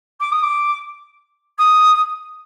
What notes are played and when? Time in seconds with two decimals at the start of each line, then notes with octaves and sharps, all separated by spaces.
0.20 D6
0.31 D#6
0.42 D6
1.58 D#6